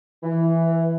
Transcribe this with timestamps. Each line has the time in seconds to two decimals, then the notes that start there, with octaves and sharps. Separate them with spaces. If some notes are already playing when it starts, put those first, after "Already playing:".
0.23 E3